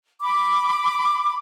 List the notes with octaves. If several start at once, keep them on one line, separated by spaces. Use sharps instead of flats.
B5 D6